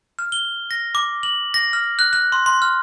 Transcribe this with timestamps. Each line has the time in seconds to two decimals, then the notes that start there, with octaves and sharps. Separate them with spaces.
0.19 F6
0.32 G7
0.71 A#6
0.95 D6
1.23 F#7
1.54 A#6
1.73 F6
1.99 F#6
2.13 F#6
2.32 C6
2.46 C6
2.62 F6